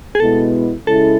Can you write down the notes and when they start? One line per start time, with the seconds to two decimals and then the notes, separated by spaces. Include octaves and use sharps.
0.15 G#4
0.20 B2 G#3 B3 E4 A4
0.87 C#3 G#3 C#4 E4 A4